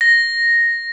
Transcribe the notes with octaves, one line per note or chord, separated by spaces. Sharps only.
A#6